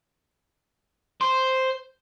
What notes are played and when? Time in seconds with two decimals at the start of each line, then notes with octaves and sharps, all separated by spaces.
1.21 C5